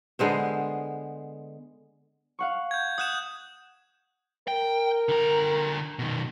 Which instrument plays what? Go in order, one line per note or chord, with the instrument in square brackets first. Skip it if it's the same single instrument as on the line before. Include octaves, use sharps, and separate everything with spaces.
[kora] D3 G#3 B3 C5
[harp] F5 F#5 C#6
[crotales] G6 G#6
[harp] F#5 [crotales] D#6 F#6 E7
[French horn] A#4 [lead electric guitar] G5
[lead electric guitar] D3 A#5
B2 D#3